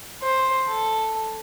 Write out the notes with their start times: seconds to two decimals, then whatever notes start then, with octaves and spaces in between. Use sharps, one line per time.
0.22 C5
0.68 A4